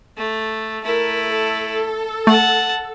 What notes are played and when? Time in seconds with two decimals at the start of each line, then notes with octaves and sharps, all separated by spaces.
0.17 A3
0.84 A3 E4 A#4
1.30 A4
2.27 A3 F#5 A5